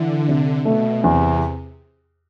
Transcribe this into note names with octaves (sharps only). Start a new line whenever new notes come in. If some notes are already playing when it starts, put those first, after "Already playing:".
Already playing: D3 E3
C3
B2 A3
E2 C3